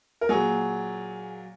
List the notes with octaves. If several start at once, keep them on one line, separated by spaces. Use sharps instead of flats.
A#4
A#2 F#3 G#4